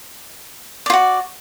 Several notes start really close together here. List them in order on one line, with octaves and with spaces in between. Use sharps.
D5 F4 F#4